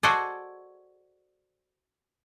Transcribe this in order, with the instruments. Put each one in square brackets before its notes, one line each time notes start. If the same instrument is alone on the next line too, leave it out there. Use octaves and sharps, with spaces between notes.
[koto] F#4 G#4 A4 C5 D5 D#5